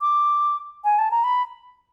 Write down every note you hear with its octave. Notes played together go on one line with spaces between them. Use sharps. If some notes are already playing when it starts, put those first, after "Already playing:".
D6
G#5
A5
A#5
B5